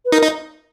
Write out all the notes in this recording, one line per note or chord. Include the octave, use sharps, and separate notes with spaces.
B4
D#4 A#4
D#4